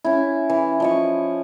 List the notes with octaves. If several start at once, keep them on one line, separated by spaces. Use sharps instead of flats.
C#4 E4
E3
F3 D#5 C#6